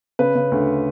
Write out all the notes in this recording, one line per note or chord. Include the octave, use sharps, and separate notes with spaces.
C#3 B4
C#3
D2